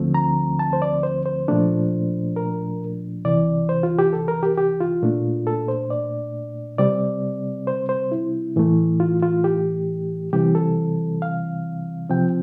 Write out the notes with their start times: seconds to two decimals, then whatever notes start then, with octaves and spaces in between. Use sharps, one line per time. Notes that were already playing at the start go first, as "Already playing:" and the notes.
Already playing: D2 D3 F3 A3 C4
0.14 A#5
0.59 A5
0.73 C5
0.82 D5
1.03 C5
1.26 C5
1.48 A#2 F3 A3 D4
2.36 A#4
3.25 C2 C3 E3 D5
3.69 C5
3.83 F4
3.99 G4
4.13 A4
4.28 A#4
4.43 G4
4.58 G4
4.80 F4
5.02 A#2 A3 D4
5.47 A4
5.68 C5
5.90 D5
6.78 C3 G3 C4 D5
7.67 C5
7.89 C5
8.12 E4
8.56 A2 E3 A3
9.00 F4
9.23 F4
9.44 G4
10.33 C3 E3 G3 C4 G4
10.55 A4
11.22 F5
12.09 C3 F3 C4 G5